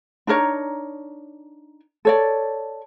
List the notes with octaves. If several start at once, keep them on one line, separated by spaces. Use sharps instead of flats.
D4 D#4 A#4 C#5
A4 C#5 D5